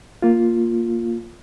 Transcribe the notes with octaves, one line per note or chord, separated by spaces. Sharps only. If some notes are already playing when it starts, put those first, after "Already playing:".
A#3 F4